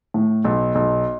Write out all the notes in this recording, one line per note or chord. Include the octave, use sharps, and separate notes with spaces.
A2
B1
B1